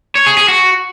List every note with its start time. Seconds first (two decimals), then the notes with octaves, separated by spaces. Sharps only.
0.15 C#5
0.26 G#4
0.37 G#4
0.48 F#4